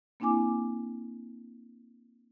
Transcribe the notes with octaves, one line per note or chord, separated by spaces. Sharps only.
A#3 C4 D4 E4 G#5 D6